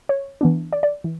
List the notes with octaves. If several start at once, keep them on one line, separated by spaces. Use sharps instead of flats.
C#5
E3 B3 D4
D5
D5
E3